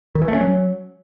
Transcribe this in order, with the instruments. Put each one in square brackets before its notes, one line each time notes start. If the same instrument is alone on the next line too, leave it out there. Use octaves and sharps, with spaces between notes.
[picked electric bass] D#3
E3
A3
C#4
F#3